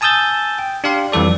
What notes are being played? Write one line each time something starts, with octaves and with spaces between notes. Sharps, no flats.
G#5 A5 D#6 E6 G6 A6
G5
D4 G4 F5 C6
F2 E3 G3 A4 D5